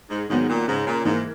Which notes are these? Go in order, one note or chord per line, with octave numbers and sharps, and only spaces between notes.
G#2
G#2 D#3 F#3 B3
A#2
G#2 C#3
A#2
G#2 E3 A#3